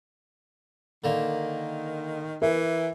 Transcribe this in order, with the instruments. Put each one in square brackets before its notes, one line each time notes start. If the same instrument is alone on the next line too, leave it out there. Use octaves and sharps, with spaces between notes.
[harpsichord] D3 A#3 [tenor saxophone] D#3
[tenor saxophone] E3 [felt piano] A#4 E5